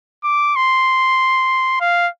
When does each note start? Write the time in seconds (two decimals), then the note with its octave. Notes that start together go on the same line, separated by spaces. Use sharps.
0.24 D6
0.56 C6
1.80 F5